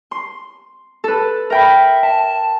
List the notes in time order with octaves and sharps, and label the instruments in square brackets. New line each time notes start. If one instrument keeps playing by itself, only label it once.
[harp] C6
A4 B4
[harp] A#4 G5 B5 [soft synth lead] E5
[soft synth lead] A5